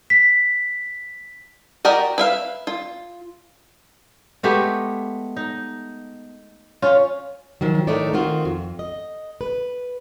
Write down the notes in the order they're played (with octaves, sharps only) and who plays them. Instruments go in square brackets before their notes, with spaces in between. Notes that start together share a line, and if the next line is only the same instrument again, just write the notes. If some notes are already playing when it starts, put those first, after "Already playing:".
[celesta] B6
[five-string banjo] F#4 G4 A#4 D5 D#5
B4 E5 F5
F4
[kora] G#3 A3 B3 G4
D#4
C#4 F4
[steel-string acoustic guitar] D#3 F3 F#3
A2 D#3 A3 D#4 C#5 D5
D#3 C4 F4 F#4
F2
D#5
B4